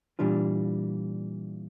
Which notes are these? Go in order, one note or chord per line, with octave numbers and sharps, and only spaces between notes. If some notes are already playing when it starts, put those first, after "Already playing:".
A#2 E3 G3 D4 F4